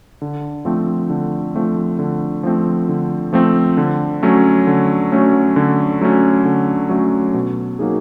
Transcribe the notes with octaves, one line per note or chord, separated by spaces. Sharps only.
D3
F3 A3 C4
D3
F3 A3 C4
D3
F3 A3 C4
D3
F3 A3 C4
D3
F#3 A3 C#4
D3
F#3 A3 C#4
D3
F#3 A3 C#4
D3
F#3 A3 C#4
B2
F#3 A#3 D#4 G#4